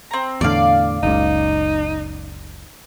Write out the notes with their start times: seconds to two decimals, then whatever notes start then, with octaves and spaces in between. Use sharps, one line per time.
0.11 C4 A#5
0.41 E2 A2 D3 D5 F5
1.03 F#1 C#2 D#4